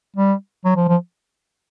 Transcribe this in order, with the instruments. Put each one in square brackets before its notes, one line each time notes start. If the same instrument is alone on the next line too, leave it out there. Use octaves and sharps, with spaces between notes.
[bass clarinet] G3
F#3
F3
F3